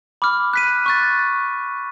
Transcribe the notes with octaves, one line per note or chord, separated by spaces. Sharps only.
B5 D6 F6
F#6 B6 D#7
C#6 F#6 A6